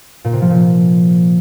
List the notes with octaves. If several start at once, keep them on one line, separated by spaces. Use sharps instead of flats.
A#2
C3
F3
A#2